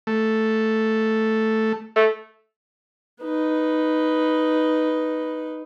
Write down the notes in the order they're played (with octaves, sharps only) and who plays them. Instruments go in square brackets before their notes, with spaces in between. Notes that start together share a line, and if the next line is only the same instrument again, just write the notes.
[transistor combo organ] A3
[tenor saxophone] A3
[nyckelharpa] D#4 B4